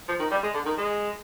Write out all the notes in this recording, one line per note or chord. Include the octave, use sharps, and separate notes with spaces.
F3
D#3
G3
G#3
D3
D#3
G#3